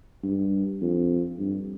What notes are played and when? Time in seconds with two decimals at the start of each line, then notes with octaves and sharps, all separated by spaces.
0.23 G2
0.81 F2
1.38 G2